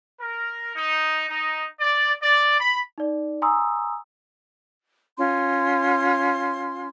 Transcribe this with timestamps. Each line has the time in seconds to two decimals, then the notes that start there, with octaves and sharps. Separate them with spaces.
0.21 A#4
0.76 D#4
1.29 D#4
1.80 D5
2.22 D5
2.60 B5
2.98 D#4 D5
3.42 G#5 A#5 C6 D#6 E6
5.17 C#4 F4 C6